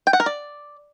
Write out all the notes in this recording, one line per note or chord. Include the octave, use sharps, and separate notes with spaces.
G5
F#5
A#4
D5